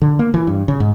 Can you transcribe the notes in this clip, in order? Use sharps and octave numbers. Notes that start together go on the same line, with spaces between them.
D3
A#3
E3
G2
C#3
G#2